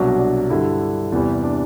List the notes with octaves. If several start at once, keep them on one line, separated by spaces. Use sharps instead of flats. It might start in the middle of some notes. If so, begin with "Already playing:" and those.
Already playing: C2 B2 F#3 D4 F#4
D4
G2 D3 G3 E4
E2 C3 E3 G3
D4